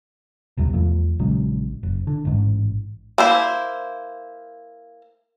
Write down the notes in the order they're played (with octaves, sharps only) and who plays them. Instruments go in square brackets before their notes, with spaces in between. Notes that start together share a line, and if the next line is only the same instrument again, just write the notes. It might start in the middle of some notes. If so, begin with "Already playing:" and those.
[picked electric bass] A#1 D#2 C3 G3
E2 F3 A3
A#1 C#3 F#3 G#3
F#1
D3
A1 G#2
[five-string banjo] A#3 E4 C5